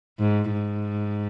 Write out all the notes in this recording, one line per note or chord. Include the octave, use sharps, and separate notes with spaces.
G#2
G#2